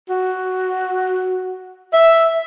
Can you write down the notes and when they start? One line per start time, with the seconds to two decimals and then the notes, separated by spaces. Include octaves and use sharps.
0.10 F#4
1.93 E5